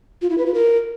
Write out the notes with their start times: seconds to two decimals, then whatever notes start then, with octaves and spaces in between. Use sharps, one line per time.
0.22 F4
0.30 E4
0.38 B4
0.46 F4
0.54 A#4